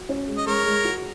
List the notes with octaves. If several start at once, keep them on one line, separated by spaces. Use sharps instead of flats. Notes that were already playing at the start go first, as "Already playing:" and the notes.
Already playing: F#4
C#4
G#3
D#5
G#3 A#4 C#5
G#3
F#4